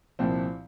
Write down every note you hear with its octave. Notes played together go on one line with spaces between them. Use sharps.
C2 A#2 F3 C4